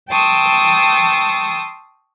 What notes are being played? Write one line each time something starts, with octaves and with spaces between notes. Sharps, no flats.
G5 A5 C6 C#6 D#6 E6